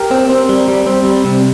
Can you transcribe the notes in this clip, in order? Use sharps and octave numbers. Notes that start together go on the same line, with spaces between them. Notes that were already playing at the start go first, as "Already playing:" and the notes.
Already playing: G4 A#4
C4
C4
G3
G3
C4
G3
C3